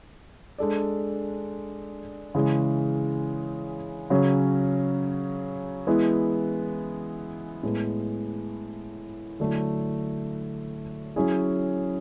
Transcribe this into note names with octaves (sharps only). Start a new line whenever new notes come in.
G#3 D4 A4 D5
C#3 E3 G#3
C#3 F#3 C#4
E3 G#3 B3 E4
A2 G#3 B3
D3 F#3 A3 E4
F#3 C#4 E4 G#4